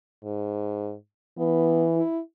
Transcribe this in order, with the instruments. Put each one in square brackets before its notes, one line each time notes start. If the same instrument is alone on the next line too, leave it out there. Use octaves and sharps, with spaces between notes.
[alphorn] G#2
[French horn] E3 [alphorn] B3
[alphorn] E4